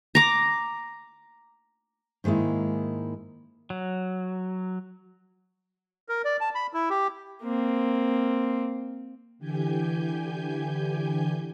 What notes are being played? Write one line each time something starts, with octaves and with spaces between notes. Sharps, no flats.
A#5 D6
G#2 D#3 G#3 A#3 E4
F#3
A#4
D5
A5
B5
E4
G4
A#3 C4
D3 E3 G4 G#5 G6